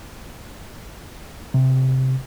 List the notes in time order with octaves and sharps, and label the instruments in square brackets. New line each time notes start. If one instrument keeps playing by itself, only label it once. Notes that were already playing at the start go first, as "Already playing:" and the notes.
[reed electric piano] C3